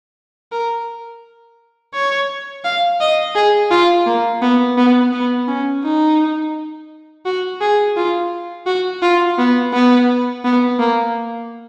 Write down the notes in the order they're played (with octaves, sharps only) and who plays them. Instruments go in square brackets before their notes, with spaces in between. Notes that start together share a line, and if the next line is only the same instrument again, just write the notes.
[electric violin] A#4
C#5
F5
D#5
G#4
F4
A#3
B3
B3
B3
C#4
D#4
F#4
G#4
F4
F#4
F4
B3
B3
B3
A#3